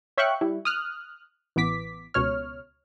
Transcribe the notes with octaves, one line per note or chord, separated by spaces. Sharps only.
C#5 E5 F5 G5 C#6 F#6
G3 E4
D#6 F6 F#6
A1 E3 B3 D6 B6
C#2 B2 C#5 F6